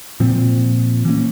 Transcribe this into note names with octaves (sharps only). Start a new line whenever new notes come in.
A#2 F3 C4
E3 A#3 C#4